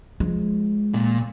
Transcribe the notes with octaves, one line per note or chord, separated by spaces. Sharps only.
F3 G#3
A#2